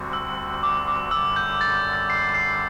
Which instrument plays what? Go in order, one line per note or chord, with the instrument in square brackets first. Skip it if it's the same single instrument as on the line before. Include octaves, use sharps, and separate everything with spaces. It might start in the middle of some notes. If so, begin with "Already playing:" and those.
Already playing: [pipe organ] D2 D3 G3 C4 F#4
[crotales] E6
D6
D6
[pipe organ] F#2 D3 G3 [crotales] E6
[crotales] G6
A6
A6
C7
C7